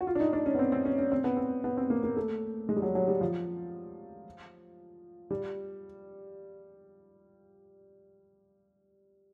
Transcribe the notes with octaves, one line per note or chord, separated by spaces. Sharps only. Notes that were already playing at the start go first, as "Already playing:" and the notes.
F#4
F4
D4
D#4
D4
C#4
B3
C4
C4
C#4
C#4
C4
B3
C4
B3
C4
A#3
A#3
A3
G#3
G3
F#3
F#3
G3
F3
G3